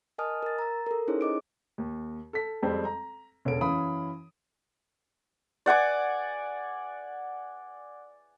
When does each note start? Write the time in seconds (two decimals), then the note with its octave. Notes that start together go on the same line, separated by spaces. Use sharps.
0.18 A#4 D#5 G#5 A5 D#6 F6
0.43 A#4 A6
0.59 A#5 E6
0.86 A4 A#4
1.08 C#4 D#4 E4 G#4 C5 C#5
1.21 D#5 D6 D7
1.78 D#2
2.33 A4 B6
2.63 F2 G3 G#3 C4
2.85 A#5
3.45 E1 C#4 A4 D7
3.61 F#2 E3 C#4 F5 B5 D#6
5.66 D5 F#5 G#5 D6